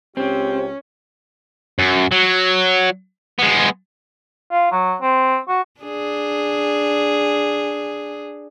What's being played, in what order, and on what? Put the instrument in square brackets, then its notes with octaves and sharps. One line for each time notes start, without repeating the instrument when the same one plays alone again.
[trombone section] C#2 G4 [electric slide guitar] C4 [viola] C#4
[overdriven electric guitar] F#2
F#3
G#3 B3
[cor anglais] F4
F#3
C4
F#4
[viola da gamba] D4 G#4